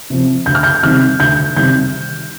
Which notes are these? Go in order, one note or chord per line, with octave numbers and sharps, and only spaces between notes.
C3 F3
D2 G6
F6
G6
C3 D#3 G3 F6
D2 G6
C3 D#3 G3 G6